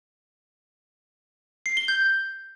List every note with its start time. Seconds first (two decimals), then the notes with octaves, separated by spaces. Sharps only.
1.66 C7
1.77 G7
1.88 G6